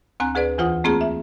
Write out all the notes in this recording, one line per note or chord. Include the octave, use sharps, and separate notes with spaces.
D2 C4 G#5 A#5 F#6
D2 G#4 B4 D5
E2 E3 F4 C5 F#5 D#6
A3 A#3 C4 F4 G#4
E5